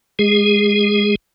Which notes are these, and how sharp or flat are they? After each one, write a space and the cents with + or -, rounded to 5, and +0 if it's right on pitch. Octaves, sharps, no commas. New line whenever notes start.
G#3 +0 G#4 -20